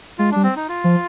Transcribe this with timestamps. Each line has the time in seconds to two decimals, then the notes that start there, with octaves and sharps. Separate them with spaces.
0.19 G#3 F4
0.31 G3 D4
0.43 C4
0.56 D#4
0.68 F4
0.84 F3